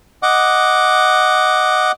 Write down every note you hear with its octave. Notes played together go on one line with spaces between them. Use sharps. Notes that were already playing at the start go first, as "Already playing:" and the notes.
D#5 F#5 D6